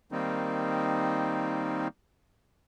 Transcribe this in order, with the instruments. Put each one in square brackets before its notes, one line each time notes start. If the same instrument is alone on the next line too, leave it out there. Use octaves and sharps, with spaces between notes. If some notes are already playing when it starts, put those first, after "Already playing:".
[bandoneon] D#3 G3 A#3 C4 D#4